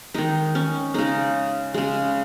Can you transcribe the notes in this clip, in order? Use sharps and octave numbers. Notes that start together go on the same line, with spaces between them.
D#3 G#3 D#4
C#4
C#3 G#3 D#4
C#3 G#3